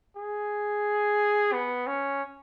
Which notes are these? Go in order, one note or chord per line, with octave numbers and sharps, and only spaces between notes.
G#4
B3
C#4